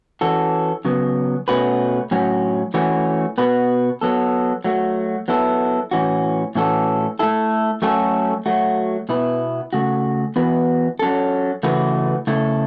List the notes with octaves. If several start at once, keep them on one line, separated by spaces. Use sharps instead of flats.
E3 C#4 F#4 A4
C#3 F#3 B3
B2 A3 C#4 F#4 B4
A2 F#3 C#4 F#4
E3 A3 C#4 F#4
B2 B3 F#4 B4
F#3 B3 A4
F#3 A3 F#4
F#3 B3 E4 A4
A2 E3 C#4 F#4
A2 E3 C#4 F#4 A4
A3 E4 A4
F#3 A3 C#4 F#4 A4
F#3 A3 F#4
B2 B3 E4 B4
C#3 A3 F#4
E3 B3 F#4 B4
F#3 C#4 A4
C#3 E3 A3 F#4 B4
C#3 A3 E4 A4